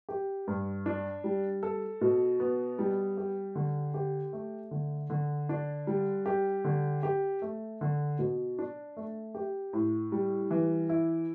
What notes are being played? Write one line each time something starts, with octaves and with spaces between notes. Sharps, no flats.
G4
G2
D4
G3
A4
B2
B3
G3
G4
D3
G4
A3
D3
D3
D4
G3
G4
D3
G4
A3
D3
B2
D4
A3
G4
A2
G3
E3
E4